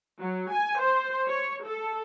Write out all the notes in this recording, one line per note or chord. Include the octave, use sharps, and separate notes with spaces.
F#3
G#5
C5
C#5
A4